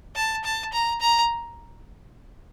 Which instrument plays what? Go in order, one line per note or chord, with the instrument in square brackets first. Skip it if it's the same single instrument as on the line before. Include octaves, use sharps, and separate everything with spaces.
[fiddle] A5
A5
A#5
A#5